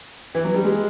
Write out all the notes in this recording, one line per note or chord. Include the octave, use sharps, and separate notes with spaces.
E3
F#3
G3
G#3